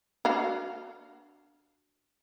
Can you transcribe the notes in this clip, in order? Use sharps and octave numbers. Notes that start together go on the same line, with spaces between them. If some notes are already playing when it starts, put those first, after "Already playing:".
D4 F#4 F5